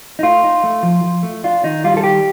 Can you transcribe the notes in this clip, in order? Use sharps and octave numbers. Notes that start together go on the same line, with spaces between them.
D#4
A3 F4
D#4
A3
F3
F3
A3
D4 F4
D#3 D#4
G3 F4
A4
D#3 G4